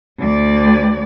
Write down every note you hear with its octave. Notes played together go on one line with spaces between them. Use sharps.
D2 D5